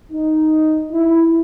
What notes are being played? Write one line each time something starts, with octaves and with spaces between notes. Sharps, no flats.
D#4
E4